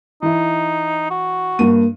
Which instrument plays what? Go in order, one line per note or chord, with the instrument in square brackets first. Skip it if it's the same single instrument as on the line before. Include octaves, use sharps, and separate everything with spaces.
[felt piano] E3 E4 [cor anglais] D#4
[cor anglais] F#4
[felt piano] G2 D#7 [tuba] A#3